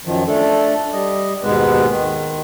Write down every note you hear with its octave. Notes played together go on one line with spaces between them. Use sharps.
F#2 D#3 F3
A3 D4 A4
G3 D#5
D#2 G#2 B2 G#3 B3 B4
D#3